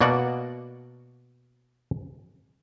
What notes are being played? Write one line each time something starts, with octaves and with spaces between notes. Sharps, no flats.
B2 A#3 F#4 D5 F#5